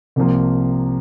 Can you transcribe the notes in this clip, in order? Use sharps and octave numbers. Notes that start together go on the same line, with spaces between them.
C2 C3 F3 A#3